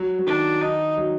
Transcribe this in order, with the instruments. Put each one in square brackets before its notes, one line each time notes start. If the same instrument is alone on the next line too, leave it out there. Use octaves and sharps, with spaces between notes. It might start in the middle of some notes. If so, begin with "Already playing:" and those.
Already playing: [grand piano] F#3
F#3
[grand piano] D#3 [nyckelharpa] D4
[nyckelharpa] D#4
[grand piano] F#3